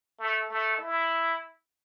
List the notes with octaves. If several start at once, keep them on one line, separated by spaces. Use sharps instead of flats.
A3
A3
E4